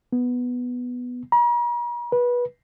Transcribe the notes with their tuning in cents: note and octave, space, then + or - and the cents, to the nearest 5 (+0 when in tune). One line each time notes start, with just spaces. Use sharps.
B3 +0
A#5 +45
B4 -20